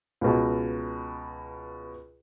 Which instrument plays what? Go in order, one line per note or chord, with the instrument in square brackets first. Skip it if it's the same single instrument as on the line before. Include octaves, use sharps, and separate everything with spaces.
[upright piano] C#2 B2